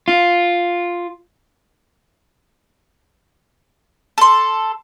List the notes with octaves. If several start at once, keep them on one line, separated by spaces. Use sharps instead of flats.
F4
A4 C6